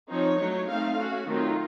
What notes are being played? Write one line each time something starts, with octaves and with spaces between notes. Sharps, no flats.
F3 C4 D#4 C#5
F#3 A3 D#4
A3 C4 D#4 F5
A3 C#4 F#4
D#3 F#3 A3 C4 D#4 F4